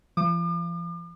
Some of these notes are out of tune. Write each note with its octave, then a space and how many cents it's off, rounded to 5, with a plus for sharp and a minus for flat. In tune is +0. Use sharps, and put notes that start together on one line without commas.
F3 -40 D6 +45